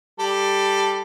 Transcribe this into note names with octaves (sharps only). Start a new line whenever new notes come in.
G3 A4